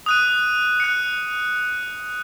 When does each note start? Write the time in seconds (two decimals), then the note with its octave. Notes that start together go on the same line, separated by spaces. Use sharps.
0.06 D#6 F#6 D#7
0.80 F#6 C#7